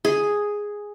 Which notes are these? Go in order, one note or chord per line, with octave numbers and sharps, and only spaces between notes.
G#4